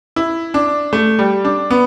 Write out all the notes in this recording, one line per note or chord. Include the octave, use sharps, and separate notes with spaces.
E4
D4
A3
G3
D4
B3